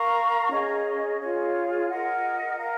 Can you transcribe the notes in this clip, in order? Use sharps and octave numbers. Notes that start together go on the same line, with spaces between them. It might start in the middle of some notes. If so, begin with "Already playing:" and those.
Already playing: A#4 F5 A#5 C#6
C#4 G#4 D#5
F4 G#4 C#5
A#4 D#5 F#5
A#4 F5 A#5